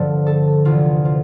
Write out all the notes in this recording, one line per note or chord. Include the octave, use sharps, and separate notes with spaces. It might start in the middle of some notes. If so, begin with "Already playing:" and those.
Already playing: G2 D3 F3 A4
A4
D2 C3 E3 F4
F4